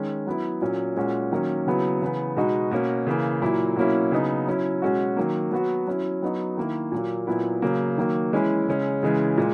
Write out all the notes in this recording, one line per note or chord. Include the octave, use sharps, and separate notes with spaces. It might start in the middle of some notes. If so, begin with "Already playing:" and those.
Already playing: D#3 G#3 C#4
F#3 B3 E4
A#2 F#3 C#4
A#2 G#3 C#4 F#4
D#3 F#3 A#3 C#4
C#3 F#3 B3 E4
C#3 E3 B3
B2 G#3 B3 D#4 F#4
B2 A#3 C#4
C#3 E3 A#3
A#2 F#3 A#3 E4
B2 F#3 A#3 C#4 E4
C#3 F#3 B3 D#4
F#3 C#4 E4
B2 G#3 C#4 F#4
D#3 F#3 A#3
F#3 B3 F#4
F#3 C#4 E4
F#3 B3 D#4 F#4
D#3 A#3 E4
A#2 F#3 A#3
A#2 F#3 B3 E4
C#3 F#3 A#3
D#3 F#3 A#3
E3 G#3 C#4 E4
C#3 G#3 C#4
C#3 E3 G#3 C#4
A#2 G#3